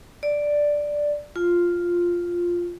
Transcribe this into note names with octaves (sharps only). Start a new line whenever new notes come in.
D5
F4